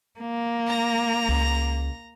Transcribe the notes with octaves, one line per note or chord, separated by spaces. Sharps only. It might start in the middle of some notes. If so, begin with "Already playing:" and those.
A#3
A#5 A#6
C#2